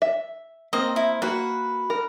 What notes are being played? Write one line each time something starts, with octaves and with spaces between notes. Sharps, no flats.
E5
A#3 C4 D#5
E4
A#3 F#4 B4
A#4